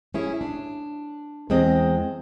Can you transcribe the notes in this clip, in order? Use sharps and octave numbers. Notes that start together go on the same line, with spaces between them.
C#4 E4 G#4
D4
E2 G#3 C4 D#5